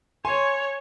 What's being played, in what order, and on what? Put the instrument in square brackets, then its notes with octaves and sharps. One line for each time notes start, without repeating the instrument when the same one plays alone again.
[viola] C#5 [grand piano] G#5 C6